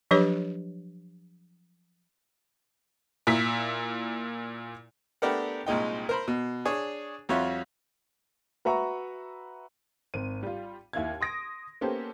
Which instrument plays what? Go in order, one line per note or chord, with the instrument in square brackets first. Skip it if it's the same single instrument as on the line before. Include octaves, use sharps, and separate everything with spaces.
[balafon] F3 F#3 D4 G4 B4 C#5
[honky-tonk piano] A#2 E4 B6
[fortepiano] A3 B3 D4 G4 A#4 F#5
C2 A#2 G#3 D#4 G5
A#4 C5 B5
B2
D4 G#4 C#5
F2 G3 F4 F#4 C#5 E5
[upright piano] F#4 B4 E5 A#5 C#6
[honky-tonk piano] G#1 C4 D#7
G3 F4
D#2 E4 F5 G#6
C6 D#6 A#6 D7
A#3 B3 C#4 G4 A4 C5